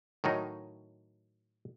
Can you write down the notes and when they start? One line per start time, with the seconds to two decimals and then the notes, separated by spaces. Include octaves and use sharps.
0.24 A2 D#3 F#3 D#4